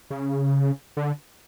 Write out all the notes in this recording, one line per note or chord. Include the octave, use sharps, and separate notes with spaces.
C#3
D3